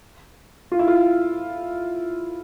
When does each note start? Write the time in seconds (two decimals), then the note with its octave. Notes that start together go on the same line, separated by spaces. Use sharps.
0.72 F4
0.79 E4
0.88 F4